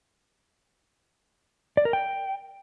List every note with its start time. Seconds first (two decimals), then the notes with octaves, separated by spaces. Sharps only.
1.77 D5
1.85 A#4
1.93 G5